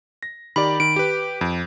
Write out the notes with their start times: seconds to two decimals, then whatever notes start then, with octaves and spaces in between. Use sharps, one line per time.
0.23 A#6
0.56 D#3 G4 D5 B5
0.80 D#3 D7
0.96 G4 B4
1.41 F2